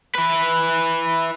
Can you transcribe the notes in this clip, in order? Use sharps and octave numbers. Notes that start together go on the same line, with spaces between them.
E4 B4